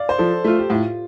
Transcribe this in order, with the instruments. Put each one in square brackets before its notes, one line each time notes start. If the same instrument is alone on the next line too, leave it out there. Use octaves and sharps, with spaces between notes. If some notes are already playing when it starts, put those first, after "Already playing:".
Already playing: [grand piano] D5 F5
C5
[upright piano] F3 [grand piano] A4
[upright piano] A3 F4
[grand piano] G4
[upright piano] A2 [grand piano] F4